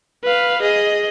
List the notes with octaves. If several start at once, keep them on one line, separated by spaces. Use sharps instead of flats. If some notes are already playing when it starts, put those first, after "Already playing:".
B4 F5
G#4 D#5